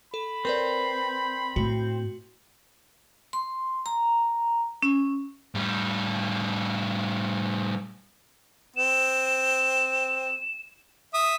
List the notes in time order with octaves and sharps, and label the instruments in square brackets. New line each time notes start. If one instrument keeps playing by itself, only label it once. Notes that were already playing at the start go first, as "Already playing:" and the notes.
[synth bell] A4 [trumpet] B5
[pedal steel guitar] C4 [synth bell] A#4 B4 D5
[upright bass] A2 [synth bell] F#4
[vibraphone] C6
A#5
C#4
[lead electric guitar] A2 G3
[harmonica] C4 [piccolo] E7
[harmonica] E5 D#6